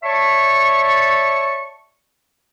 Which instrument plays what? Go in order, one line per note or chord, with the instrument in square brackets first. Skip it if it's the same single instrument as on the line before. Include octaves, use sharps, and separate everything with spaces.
[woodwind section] C#5 D5 E5 A5 C#6